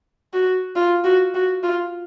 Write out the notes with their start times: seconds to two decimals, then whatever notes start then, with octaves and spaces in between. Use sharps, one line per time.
0.33 F#4
0.76 F4
1.04 F#4
1.34 F#4
1.63 F4